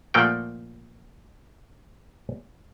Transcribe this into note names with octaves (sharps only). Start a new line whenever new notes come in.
A#2 F3 A3 A#3 F#5 G5